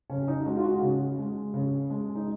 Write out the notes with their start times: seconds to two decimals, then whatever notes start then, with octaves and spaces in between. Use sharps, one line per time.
0.10 C#3 C#4
0.28 D#4
0.46 G#3 F#4
0.57 F4
0.64 F#4
0.81 C#3
1.18 G#3
1.54 C#3
1.90 G#3
2.15 D#4